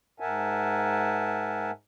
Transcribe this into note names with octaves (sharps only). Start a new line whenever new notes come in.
G#2 A#4 E5 F#5 G#5 A5